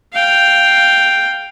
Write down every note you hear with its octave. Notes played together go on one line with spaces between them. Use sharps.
F5 G5